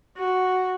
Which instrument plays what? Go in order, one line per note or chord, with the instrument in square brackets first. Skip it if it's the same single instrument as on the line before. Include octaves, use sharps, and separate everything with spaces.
[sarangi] F#4